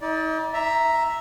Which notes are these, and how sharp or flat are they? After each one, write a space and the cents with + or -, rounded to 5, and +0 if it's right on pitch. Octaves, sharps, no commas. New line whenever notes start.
D#4 +40 D5 +0
E5 +0 A#5 +0